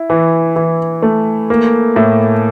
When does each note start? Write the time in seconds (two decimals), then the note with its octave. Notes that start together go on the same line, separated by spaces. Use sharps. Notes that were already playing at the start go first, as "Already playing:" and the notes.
Already playing: E4
0.10 E3
0.56 E3
1.02 A3
1.50 A#3
1.96 A2